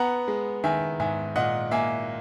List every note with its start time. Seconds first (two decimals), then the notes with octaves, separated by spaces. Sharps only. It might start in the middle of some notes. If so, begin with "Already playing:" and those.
Already playing: B3 F#5 A#5
0.28 G#3
0.64 D#3 E5 G#5
1.00 G#2 E5 G#5
1.36 A#2 D#5 F#5
1.71 A#3 E5 G#5